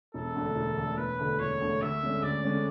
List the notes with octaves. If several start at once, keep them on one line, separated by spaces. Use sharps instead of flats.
E1 A4
D2 D3 A3
E1
D2 D3 A3
E1 B4
D2 D3 A3
E1 C#5
D2 D3 A3
D2 E5
D3 G#3 C#4
D2 D5
D3 G#3 C#4